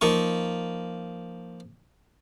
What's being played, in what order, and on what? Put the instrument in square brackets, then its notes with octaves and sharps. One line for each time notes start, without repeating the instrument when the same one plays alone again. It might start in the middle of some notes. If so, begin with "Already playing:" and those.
[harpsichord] F3 A#3 D#4 C#6